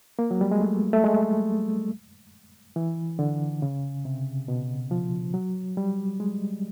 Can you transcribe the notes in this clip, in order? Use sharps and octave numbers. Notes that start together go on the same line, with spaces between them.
A#3
F#3
G3
G#3
A3
A3
G#3
E3
D3
C#3
C3
B2
F3
F#3
G3
G#3